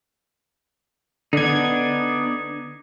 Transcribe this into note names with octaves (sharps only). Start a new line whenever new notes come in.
D3 B3 D4 D#4 G#6